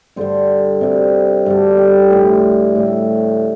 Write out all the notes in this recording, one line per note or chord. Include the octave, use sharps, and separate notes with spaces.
G2 D3 G3 C5
C3 G3
G2 D3 G3
G4
A2 G3
A2 G3